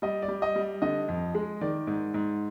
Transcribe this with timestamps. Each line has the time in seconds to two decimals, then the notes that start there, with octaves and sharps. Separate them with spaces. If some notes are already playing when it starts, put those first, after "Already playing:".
0.02 G3 D#5
0.22 D5
0.28 G3
0.42 D#5
0.56 G3
0.82 D3 D#5
1.08 F2
1.35 G#3
1.61 D#3 D5
1.87 G#2
2.14 G#2